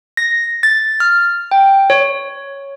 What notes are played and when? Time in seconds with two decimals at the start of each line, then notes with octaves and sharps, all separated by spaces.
0.17 A#6
0.63 A6
1.00 F6
1.51 G5
1.90 C#5